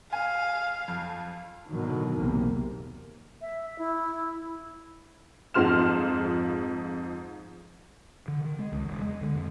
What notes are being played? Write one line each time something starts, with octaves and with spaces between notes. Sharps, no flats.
F5 G#5
F2
B2 D3 D#3 F#3
B1 E2 C3 A#3
E5
E4
F2 G#2 F3 C6 F6 E7
D3
D#3
G#3
C#2
E1
G#3
D3
F2